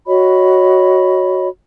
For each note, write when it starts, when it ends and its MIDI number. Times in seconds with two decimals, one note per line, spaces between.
0.07 1.48 66
0.07 1.48 73
0.07 1.48 75
0.07 1.48 83